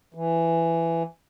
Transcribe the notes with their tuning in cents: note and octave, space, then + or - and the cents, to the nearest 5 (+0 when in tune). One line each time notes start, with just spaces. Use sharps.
E3 +10